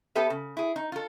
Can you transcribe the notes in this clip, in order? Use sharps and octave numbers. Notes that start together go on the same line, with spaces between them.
B3 G4 A4 B4 E5
C#3
E4 G#4
D#4
F4 A4